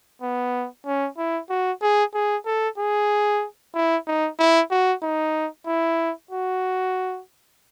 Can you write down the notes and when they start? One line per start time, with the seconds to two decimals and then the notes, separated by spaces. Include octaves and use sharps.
0.22 B3
0.86 C#4
1.18 E4
1.50 F#4
1.82 G#4
2.14 G#4
2.46 A4
2.78 G#4
3.75 E4
4.07 D#4
4.39 E4
4.71 F#4
5.03 D#4
5.67 E4
6.31 F#4